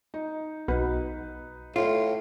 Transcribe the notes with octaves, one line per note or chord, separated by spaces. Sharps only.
D#4
B1 D#4 B4
A2 F4